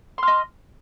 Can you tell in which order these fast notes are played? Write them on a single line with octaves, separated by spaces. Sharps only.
C6 F6 D#5